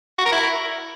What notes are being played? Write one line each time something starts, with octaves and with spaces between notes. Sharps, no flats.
F#4
A#4
E4